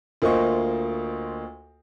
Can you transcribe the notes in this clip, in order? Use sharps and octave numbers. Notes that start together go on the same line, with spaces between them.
D2 A#3 F4 C5 D#5 C#6